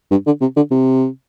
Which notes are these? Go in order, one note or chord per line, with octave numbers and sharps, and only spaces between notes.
G2
D3
C3
D3
C3